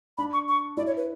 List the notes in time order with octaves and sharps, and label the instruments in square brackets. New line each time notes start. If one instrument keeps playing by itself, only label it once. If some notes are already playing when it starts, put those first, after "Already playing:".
[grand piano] D4 [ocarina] B5
[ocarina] C#6
C#6
[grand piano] E4 [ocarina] D5
[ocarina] C#5
B4